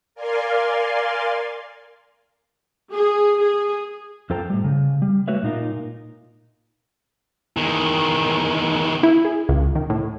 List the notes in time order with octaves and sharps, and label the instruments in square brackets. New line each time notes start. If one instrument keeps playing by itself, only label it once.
[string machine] A#4 D5 F5 G#5 C6
[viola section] G#4
G#4
[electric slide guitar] F2 F4 A4 C5 G5 A#5
A2 G3
C#3
G3
G#3 A3 F#4 B4 C#5 E5
A#2 D#4 F4 A#4
[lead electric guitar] E2 D#3
[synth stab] E4
G#4
C#2
D#3
A2